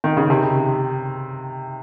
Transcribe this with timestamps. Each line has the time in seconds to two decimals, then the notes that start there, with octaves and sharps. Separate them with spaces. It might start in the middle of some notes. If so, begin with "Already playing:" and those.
0.04 D#3
0.17 C#3
0.30 C3